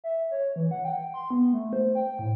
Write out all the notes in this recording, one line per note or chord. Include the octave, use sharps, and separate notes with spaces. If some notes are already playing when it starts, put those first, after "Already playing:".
E5
C#5
E3
F#5
G5
C6
B3
A3
C5
G5
A2